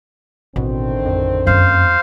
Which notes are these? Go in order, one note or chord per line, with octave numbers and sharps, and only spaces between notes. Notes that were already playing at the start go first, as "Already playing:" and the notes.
A1 B2 D3 D#3 C4
F2
F#2 A#3 C5 F5